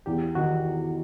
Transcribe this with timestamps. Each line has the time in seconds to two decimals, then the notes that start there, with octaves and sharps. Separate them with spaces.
0.06 E2 G4
0.35 D#3 F#4